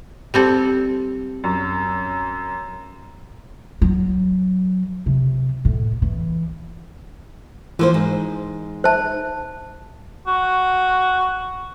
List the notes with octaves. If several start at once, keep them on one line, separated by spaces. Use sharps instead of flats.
G3 C4 A4
F#2
F#3
C3
A2
E3
E3 F3 A#3 C5
G#2
C5 A5
F#4